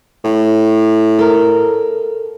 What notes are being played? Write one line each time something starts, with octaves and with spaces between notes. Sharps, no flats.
A2
A4 A#4